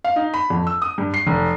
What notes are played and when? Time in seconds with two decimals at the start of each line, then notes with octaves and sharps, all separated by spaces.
0.04 F5
0.16 D#4
0.34 B5
0.50 F2
0.67 E6
0.82 D#6
0.98 G2
1.14 C7
1.27 F1